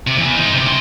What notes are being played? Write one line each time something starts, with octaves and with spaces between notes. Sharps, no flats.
C3
E2 E3
D#4 C5
C3
C#4 C6